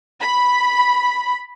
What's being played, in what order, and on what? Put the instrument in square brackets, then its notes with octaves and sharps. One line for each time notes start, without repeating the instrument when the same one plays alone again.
[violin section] B5